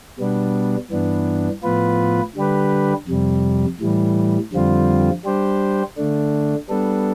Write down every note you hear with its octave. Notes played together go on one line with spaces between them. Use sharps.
B2 G3 B3 D4
G2 E3 B3 D4
A2 F3 B3 F4 B4
D3 G3 D4 G4 B4
F2 C3 G3
A2 E3 G3
F2 D3 G3 C4 F4
G3 D4 G4 C5
D3 A3 D4
G3 B3 D4 A4